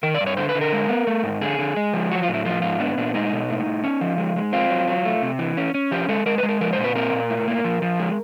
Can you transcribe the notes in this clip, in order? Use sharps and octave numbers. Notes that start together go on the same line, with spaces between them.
D#3 A#4
D5
G2
C#5
D3 C5
B4
D3
A#4
G#3
B3
A3
G#2
D3 G#4
D3
G#3
F3
F#3 F#4
F4
A2
E4
F3 F4
G#2 F4
B3 D4
A#2 D4
G#3 D#4
B2
A2
A2
C#4
F3
G#3
G#3
C4 F4
F#3
F#3
A3
C3
E3
C#4
C#4
F3 G4
G#3 A4
G#3 A#4
G#3 B4
A#4
F3 A#4
C5
A#2
B4
C4 A#4
A#2
A2
A#3
F3
F3
G#3